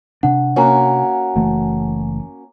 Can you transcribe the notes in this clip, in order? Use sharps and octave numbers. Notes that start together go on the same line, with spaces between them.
C3 D4 F#5
A#3 C#4 F#4 C#5 G#5 A#5
F#1 E3 A3